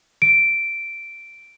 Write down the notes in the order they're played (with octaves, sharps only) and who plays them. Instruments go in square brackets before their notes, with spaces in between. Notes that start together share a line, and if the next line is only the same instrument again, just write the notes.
[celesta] D7